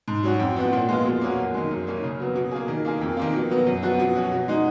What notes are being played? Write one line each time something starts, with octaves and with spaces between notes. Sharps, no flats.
G#2
F#3 C#4 F#4
F2
F3 B3 F#4
A#2
G#3 B3 F4
B2
A#3 C#4 F#4
F#2
D#3 G#3
F#2
D#3 A#3 C#4
C#3
F#3 B3
B2
A#3 F4 G#4
D#3
A#3 F4 G#4
F2
D#3 A#3 F4
B2
F#3 B3
F#2
F3 B3 F#4
B2
F#3 C#4 F#4
B2
G#3 D#4 F#4